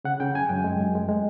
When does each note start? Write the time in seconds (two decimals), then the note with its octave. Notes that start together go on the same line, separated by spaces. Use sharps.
0.05 C#3 F#5
0.20 C#3 G5
0.35 F#2 G#5
0.49 F#2 G5
0.64 G#3
0.80 F#2
0.95 G#3
1.09 G#3